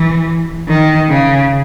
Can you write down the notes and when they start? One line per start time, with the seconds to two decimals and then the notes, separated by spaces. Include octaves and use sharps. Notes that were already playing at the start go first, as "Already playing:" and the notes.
Already playing: E3
0.68 D#3
1.09 C#3